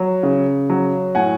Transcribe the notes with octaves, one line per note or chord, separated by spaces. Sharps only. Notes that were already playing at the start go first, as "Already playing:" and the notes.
Already playing: F#3
C#3
F#3
A2 F#5 G#5